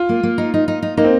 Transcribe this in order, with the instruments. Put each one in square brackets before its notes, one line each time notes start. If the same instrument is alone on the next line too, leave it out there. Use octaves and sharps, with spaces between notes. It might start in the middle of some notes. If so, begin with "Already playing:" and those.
Already playing: [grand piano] F4
[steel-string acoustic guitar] A#3
A#3
D#4
D#4
D#4
D#4
[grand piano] A#3 [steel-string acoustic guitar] D#4
[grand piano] C4